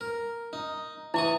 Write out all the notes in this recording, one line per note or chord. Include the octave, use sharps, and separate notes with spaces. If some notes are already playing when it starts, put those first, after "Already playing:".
A#4
D#4
E3 E4 C#6 D#6